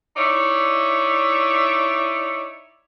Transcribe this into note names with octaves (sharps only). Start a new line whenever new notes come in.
D#4 E4 C#5 D5 E5